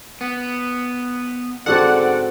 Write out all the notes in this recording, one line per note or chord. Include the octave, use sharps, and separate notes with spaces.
B3
G#2 D3 C4 F#4 A4 D5 F#5